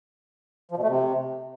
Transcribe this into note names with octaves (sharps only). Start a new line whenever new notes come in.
F3
B2
A3
C3